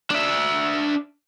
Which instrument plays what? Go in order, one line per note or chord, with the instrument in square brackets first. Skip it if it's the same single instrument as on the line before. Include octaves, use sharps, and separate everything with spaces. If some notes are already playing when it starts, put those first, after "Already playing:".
[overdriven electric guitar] D4 E5